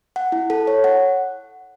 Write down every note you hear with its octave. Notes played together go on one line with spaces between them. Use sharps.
F#5
E4
A4
C#5
F#5